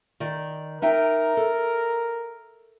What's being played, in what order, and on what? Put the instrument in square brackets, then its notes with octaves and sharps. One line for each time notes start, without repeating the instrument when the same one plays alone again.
[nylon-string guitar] D#3 D5
[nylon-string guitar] D#4 E5 G5 [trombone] A#4
[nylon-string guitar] A4